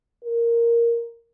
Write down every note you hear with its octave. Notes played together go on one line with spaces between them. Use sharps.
A#4